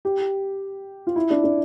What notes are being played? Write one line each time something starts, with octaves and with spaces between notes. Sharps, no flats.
G4
F4
E4
D4
D4